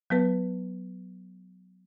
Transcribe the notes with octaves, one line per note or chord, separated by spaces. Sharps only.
F#3 B3 B4